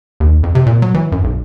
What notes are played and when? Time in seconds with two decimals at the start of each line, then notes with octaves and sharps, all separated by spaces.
0.20 D#2
0.43 F2
0.55 C3
0.66 A#2
0.82 F#3
0.94 E3
1.12 F#2
1.24 B1